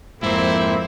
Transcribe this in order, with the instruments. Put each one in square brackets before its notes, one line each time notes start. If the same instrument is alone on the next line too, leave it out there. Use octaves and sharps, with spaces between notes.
[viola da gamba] F2 [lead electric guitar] G#2 A#3 [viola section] C4 [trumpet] E4